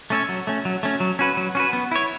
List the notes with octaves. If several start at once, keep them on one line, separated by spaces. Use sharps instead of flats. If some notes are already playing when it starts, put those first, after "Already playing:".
A3 C#4 A4 C#5
F#3
A3 C#4
F#3
A3 C#4
F#3
C#4 F#4 B4
F#3
C#4 F#4 B4
B3
E4 C#5